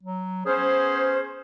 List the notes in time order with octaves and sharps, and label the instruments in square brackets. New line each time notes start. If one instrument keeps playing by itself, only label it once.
[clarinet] F#3
[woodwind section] B3 C#4 C5 [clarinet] G#4